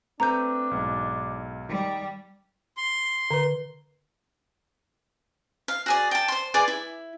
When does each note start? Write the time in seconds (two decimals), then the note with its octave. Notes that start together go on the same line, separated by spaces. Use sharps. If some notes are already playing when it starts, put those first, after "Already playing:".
0.20 A3 C4 D4 B4 A#5 G6
0.71 B1 G#2
1.69 D#3 G3
2.77 C6
3.31 D3 B4
5.68 F5
5.86 F#4 G#4 D5
6.11 G5 A5
6.28 C5 C6
6.54 G#4 B4 D5 D6
6.68 E4